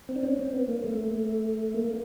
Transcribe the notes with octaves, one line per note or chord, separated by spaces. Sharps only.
C4
D4
C#4
C4
B3
A#3
A3
A#3